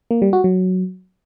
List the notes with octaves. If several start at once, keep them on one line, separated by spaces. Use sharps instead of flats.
A#3
G3
F#4
F#3